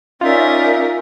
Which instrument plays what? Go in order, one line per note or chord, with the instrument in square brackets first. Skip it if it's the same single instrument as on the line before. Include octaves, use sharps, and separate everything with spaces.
[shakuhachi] C#4 [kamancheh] D#4 A#4 [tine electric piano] F4 [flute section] D5 E5